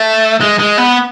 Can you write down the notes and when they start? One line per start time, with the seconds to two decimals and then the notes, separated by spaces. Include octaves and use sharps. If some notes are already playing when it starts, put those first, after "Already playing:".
Already playing: A3
0.41 G#3
0.59 G#3
0.78 B3